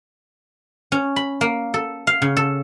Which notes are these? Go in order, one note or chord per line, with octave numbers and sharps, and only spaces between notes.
C#4
B5
A#3
A4
F5
C#3
A4